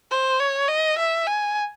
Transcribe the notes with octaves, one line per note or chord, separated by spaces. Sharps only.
C5
C#5
D#5
E5
G#5